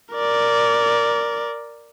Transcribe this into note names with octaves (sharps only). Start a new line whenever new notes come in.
A#4 D5